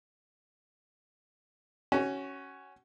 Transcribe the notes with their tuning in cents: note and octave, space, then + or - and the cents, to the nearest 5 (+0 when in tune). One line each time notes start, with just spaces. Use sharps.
C#4 +0 F#4 +25